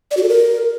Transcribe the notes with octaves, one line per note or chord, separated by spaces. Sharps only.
D5
F#4
A4
A#4